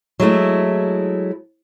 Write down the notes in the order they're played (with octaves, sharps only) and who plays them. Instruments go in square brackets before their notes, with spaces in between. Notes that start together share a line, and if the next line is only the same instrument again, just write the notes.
[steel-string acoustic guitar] F#3 G#3 A3 E4